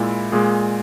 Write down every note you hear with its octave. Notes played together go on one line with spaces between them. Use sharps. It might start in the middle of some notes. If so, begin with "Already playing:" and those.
Already playing: A#2 G#3 E4
A#2 G#3 G#4